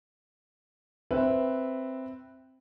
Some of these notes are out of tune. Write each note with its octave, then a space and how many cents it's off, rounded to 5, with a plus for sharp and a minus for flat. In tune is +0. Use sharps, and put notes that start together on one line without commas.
C4 +0 B4 +0 E5 +0